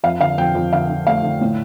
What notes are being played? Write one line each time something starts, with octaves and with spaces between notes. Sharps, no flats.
F2 F5
D3 F5
F2 G5
F2
D3 F5
D3
A3 F5
D3
A2